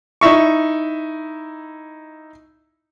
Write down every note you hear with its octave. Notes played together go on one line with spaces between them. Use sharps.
D#4 E4 E5 C#6